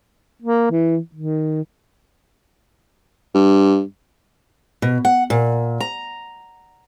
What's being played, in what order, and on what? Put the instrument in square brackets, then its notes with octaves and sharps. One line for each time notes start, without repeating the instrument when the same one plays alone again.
[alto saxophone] A#3
E3
D#3
[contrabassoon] G2
[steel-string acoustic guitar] B2
F#5
A#2
A#5